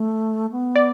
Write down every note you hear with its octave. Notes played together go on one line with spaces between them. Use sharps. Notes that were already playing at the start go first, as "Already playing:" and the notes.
Already playing: A3
B3
D5